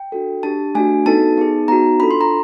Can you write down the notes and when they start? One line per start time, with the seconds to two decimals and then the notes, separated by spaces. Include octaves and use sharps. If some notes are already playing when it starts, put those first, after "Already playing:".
Already playing: G5
0.12 D4 F#4 A4
0.43 D4 G4 A5
0.75 A3 D4 F#4 G#5
1.06 B3 D#4 F#4 A4 A5
1.38 B3 D#4 G#4
1.68 B3 D#4 F#4 A#5
2.00 D4 F4 A4 B5
2.11 C6
2.21 A#5